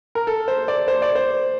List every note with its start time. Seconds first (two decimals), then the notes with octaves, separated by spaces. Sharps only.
0.15 A#4
0.27 A4
0.48 C5
0.68 D5
0.88 C5
1.02 D5
1.15 C5